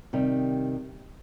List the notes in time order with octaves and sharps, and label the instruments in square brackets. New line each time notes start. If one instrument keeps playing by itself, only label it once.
[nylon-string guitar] C3 D#3 G3